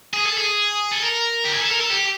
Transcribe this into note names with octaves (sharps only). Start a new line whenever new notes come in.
G#4
A4
G#4
A4
A#4
G4
G#4
A4
A#4
A4
G4